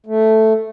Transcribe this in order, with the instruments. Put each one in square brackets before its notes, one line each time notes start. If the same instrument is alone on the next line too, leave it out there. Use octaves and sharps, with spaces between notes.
[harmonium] A3